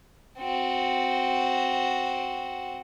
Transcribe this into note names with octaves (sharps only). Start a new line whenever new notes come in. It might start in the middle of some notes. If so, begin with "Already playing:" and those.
C4 F#4